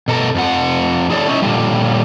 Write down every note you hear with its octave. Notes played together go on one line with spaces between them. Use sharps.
B2 A4 A#4
F2 F3 F#5
E4 G#4 A4 C#5 D5
C#4 D#4 E4
A#2 D3 F3 G3